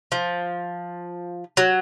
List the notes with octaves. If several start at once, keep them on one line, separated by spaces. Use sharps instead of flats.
F3
F#3